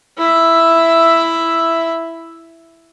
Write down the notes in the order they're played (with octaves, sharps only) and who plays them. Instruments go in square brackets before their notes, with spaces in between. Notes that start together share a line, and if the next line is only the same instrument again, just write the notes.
[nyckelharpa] E4 E5